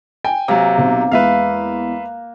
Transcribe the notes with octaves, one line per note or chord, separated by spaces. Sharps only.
G5 G#5
C3 F#3 A#3
B1 C4
E2 G#3 B4 E5 F5